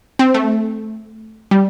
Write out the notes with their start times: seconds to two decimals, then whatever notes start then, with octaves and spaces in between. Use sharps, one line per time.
0.19 C4
0.34 A3
1.51 G3